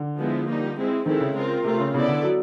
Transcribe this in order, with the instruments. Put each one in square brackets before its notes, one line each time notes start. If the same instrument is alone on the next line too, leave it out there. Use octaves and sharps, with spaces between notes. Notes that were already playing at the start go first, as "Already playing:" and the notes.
Already playing: [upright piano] D3
[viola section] F3 G#3 B3 E4
G3 A#3 D#4
G#3 C4 E4
[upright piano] D#3 [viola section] G#3 C4 E4 A4
[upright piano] C#3
[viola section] C4 F4 A#4
[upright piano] C3 [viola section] A3 C4 F4
[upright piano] C#3
[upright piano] C#3 [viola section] B3 E4 A4 D5
[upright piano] D3
F#3